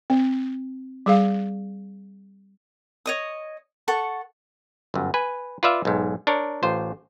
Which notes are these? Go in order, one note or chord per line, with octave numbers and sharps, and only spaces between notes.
C4
G3 G#4 F5
C#5 D#5 D#6
A4 F#5 C#6
G1 F#2
B4 G#5
F4 B4 D5 E5 F5
B1 G#2
D4 A#4 C#5
A1 F4 C5